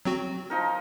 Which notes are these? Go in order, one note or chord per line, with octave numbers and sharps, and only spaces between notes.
F#3 C4 F#4
F3 D#4 A#4